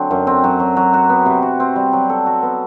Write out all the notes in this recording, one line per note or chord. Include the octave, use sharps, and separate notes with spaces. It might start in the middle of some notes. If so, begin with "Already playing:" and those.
Already playing: D3 F#3 C4
F#2
C4
F#3
F#3
F#3
F#4
B3
C3
F#4
C4
G3
F#3
A4
F#4
B3